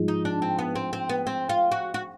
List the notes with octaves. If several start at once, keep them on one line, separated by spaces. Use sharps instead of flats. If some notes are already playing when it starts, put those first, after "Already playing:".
Already playing: G#2 F3 G#3
D#4
D4
C4
B3
C4
C4
B3
C4
F4
F#4
F#4